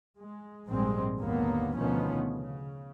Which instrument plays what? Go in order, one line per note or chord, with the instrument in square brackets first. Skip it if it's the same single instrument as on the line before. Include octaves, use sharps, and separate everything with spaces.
[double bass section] G#3
A#1 G#2 G3 G#3 C4
G#1 D#2 D3 F#3 A#3 B3
D2 B2 D#3 F3 B3 C#4
C#3